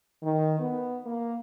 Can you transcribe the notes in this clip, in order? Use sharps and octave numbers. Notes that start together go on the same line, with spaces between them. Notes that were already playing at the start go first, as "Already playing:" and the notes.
D#3
B3
A#3